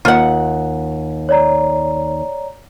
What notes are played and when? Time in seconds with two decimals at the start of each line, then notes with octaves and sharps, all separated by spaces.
0.05 D#2 F4 F#5
1.29 C#5 D5 A#5